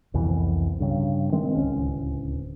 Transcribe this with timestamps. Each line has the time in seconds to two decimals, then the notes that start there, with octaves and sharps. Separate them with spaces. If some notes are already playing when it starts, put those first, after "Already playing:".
0.14 C2 F2 B2 E3
0.80 G2 C#3
1.32 D#3 G#3 C4
1.55 D1 C#2 C#4